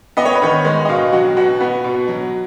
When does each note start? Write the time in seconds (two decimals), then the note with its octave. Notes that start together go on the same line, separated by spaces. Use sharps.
0.17 B3 D#5
0.25 C#5
0.35 B4
0.42 D#3 C#5
0.65 G#3
0.85 D#5
0.89 B2 F5
1.13 F#3 F#4
1.37 B2 F#4
1.61 B3
1.84 B2
2.08 F#3